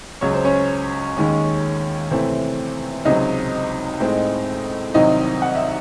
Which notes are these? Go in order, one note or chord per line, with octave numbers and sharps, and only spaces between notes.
C#2 C#3 F#3 C#5
C5
C#4 C#5
D#2 D#3 G#3 C#4
C3 E3 A3 C4
C#2 C3 F#3 C4 D#4 D#5
A2 G#3 C4
C2 C3 D#3 F#3 C4 D#4 D#5
F#5
E5